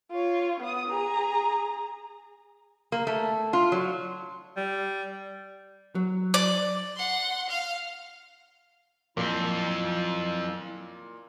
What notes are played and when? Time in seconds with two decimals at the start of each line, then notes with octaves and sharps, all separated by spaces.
0.12 F4 C#5
0.60 B3 D#6
0.90 G#4 A#5
2.92 A#3
3.07 A3
3.53 F4
3.72 F#3
4.57 G3
5.95 F#3
6.34 D5
6.97 F#5 C6
7.49 F5
9.17 F2 A#2 F#3 C4 E4 E6